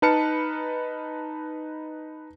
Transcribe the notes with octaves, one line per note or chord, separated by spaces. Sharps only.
D#4 B4 A5 F6 C#7